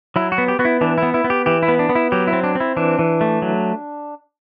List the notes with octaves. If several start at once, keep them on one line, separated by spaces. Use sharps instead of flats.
F#3 E4
F#4
B3
G4
B3 F#4
E4
E3 D4
B3 E4
E4
B3
G4
E3 G4
E4
B3
D4
B3
E4
F#3 G4
E4
C4
D4
C4 E4
E3 D4
E3
A3
F#3